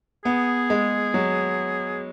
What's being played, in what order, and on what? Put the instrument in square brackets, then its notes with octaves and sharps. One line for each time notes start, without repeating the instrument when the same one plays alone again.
[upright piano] B3 [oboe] G#4
[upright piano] G#3
F#3